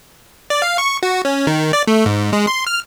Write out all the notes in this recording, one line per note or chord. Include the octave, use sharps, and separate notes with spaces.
D5
F5
C#6
F#4
C#4
D#3
D5
A3
G#2
G#3
C6
F6